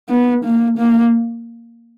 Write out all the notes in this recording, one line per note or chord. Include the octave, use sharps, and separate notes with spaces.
B3
A#3
A#3